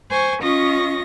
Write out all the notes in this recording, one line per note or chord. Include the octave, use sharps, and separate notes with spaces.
C5 G#5 C#6
C#4 F4 D#5 C#6 A#6